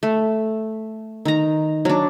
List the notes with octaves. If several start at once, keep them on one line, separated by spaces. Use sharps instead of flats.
A3
D#3 A#5
F#3 D4